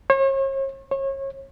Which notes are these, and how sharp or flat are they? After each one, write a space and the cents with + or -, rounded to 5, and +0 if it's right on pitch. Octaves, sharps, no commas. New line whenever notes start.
C#5 -40
C#5 -30